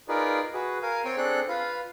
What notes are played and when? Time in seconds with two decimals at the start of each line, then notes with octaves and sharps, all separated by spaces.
0.09 D#4 F4 G#4 A#4 B4 D5
0.54 F#4 G#4 B4
0.83 A#4 F5 G#5
1.05 C4 C#5 G5 C6
1.17 C4 D4 G#4 A4 F#6
1.48 F4 B4 F5